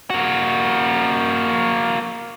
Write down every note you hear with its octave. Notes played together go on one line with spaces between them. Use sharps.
A#3 F#4